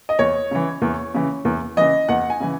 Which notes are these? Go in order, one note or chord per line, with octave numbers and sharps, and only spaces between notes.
D#5
E2 C#5
C#3 E3
E2
C#3 E3
E2
C#3 E3 D#5
E2 F#5
G#5
C#3 E3